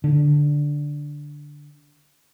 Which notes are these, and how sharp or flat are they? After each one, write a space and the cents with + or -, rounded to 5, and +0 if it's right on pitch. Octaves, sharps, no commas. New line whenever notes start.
D3 +0